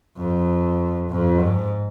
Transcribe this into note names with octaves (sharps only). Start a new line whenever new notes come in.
F2
F2
G#2